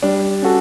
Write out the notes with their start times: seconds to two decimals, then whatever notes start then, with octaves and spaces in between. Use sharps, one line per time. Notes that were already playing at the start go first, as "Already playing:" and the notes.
0.03 G3 D4
0.42 C#4 F#4 A4